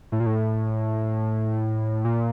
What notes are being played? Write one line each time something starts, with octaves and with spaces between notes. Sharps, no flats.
A2
A#2
A2
A#2